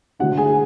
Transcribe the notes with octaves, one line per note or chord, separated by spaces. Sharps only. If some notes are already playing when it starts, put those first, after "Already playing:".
D3 A3 D4 F#4 F#5
G#4 G#5